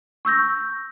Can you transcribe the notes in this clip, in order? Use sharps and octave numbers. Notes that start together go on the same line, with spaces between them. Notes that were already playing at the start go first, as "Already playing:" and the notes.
C#6 E6 G6 A#6